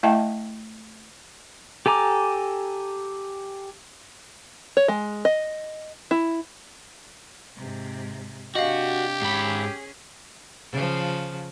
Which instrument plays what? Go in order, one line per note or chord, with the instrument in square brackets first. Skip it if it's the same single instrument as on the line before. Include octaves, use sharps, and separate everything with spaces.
[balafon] A3 E4 D#5 E5 G5 A5
[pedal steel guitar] G4 A4 G#5 A#5 D6
[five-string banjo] C#5
G#3
D#5
E4
[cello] G#2 C3
[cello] C3 D4 [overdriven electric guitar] F#4 [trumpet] G4 [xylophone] D#5 F5
[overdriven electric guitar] G#2 B5 [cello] C#4 G#4
[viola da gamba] C#3 F3